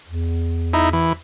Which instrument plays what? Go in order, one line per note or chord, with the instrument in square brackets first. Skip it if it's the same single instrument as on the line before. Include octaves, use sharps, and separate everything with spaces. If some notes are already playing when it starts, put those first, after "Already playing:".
[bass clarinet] E2
[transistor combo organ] D#4 E4
E3